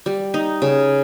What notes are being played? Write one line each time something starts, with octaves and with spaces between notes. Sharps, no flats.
G3
D#4
C#3